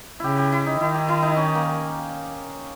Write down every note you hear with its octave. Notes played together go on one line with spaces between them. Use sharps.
C#3 E4 G4
G4
E4
D#4
D#3 E4
G4
E4
D#4
C#4
A#3